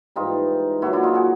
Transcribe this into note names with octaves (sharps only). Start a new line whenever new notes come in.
G#2 E3 G3 D#4 F4
A#2 F#3 E4 F#4
D4 E4
D#4 F4
F#4 G#4